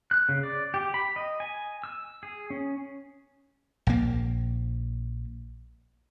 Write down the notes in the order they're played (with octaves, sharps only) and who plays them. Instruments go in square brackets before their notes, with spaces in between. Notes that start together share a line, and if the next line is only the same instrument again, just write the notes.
[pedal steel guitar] F#6
C#3
D5
G4
B5
D#5
G#5
E6
G#4
C#4
[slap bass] A#1 A#3